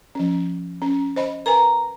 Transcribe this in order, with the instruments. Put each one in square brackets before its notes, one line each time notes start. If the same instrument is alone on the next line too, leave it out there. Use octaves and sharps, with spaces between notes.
[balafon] F3 C#4
C#4
C5 D#5 B5
[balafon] A#4 B4 G#5 [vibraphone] A#5